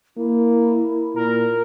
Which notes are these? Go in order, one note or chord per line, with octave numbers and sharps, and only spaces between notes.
A#3 E4
A#2 A#4